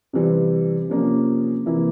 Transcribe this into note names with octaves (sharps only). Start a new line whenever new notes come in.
C3 E3 G3 C4
C3 F3 A#3 C#4
C3 E3 A#3 E4